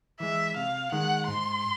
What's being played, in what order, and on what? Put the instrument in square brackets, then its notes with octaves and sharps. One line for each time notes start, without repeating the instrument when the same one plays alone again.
[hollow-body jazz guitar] E3 G#3 [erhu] E5
[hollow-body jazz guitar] C3 [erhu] F5
[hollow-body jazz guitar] D#3 G#3 [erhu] F#5
[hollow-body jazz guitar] G#2 [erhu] C6